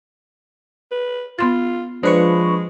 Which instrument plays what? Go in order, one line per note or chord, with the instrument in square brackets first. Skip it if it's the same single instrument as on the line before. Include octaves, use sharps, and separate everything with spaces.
[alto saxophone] B4
[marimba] B3 C6 A6 [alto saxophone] F4
[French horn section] F3 [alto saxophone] G#3 [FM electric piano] D4 B4 C#6 [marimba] C5